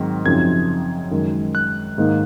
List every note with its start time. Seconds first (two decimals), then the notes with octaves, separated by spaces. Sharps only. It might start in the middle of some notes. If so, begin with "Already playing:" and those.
Already playing: G#2 D#3 F#3 C4
0.25 F#2 C#3 F3 C4 D#4 G#6
1.11 F#2 D#3 G#3
1.55 F#6
1.98 G#2 D#3 A#3 D#4